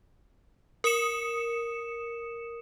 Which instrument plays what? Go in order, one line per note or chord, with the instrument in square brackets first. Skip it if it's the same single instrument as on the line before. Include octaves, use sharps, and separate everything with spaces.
[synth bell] A#4 D#6 C#7 E7